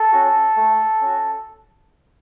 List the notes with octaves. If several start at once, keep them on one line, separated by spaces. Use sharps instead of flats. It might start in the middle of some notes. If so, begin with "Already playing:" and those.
Already playing: A4
C#4 F#4
A3
C#4 F#4